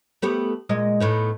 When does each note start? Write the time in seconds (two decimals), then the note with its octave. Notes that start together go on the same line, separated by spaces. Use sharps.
0.22 A3 B3 G4
0.69 A#2 G#3 D#5
1.00 A2 B3 D#4